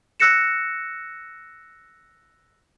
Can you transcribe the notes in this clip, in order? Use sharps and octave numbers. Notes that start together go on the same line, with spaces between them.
E6 F#6 A#6 C#7 E7